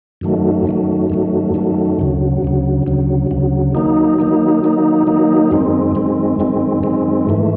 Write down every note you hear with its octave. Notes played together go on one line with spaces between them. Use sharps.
F#2 D#3 F#3 A3
F#2 D#3 F#3 A3
F#2 D#3 F#3 A3
F#2 D#3 F#3 A3
D2 C#3 F#3
D2 C#3 F#3
D2 C#3 F#3
D2 C#3 F#3
D#3 F#3 A#3 D#4
D#3 F#3 A#3 D#4
D#3 F#3 A#3 D#4
D#3 F#3 A#3 D#4
F#2 D#3 G#3 C4
F#2 D#3 G#3 C4
F#2 D#3 G#3 C4
F#2 D#3 G#3 C4
G#2 E3 A3